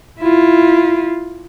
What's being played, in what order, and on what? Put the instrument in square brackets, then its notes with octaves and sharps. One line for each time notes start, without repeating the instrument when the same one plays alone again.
[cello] E4 F4